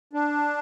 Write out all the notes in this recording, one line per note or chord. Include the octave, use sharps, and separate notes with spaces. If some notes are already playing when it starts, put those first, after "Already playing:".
D4